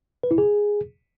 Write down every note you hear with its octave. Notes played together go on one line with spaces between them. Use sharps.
B4
E4
G#4